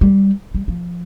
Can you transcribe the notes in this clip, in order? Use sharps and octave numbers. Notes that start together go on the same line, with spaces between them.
G3
G3
F3